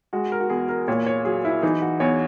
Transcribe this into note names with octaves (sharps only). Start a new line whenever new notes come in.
G#3 F#4
A#4
F#4
E2 G#4
A#4
A#2 C#5
C#5
F#3 G#4
E4
E3 D#4
F#4
E2 C#5